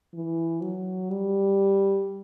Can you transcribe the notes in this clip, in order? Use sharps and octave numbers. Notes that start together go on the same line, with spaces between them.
E3
F#3
G3